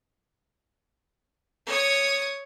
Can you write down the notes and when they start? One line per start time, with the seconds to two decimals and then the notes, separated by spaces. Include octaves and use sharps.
1.66 C#5 D#6